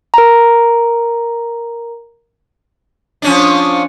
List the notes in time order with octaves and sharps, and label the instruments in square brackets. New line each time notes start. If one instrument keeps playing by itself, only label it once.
[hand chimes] A#4 A#5
[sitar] F3 C#4 D4